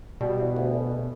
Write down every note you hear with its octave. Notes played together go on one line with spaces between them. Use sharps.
B2 G3
E4
D2
A3
A3